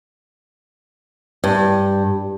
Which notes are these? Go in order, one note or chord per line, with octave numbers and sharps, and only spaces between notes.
G2